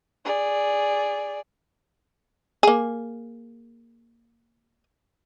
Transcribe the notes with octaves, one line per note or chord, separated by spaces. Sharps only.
G#4 D5
A#3 G#4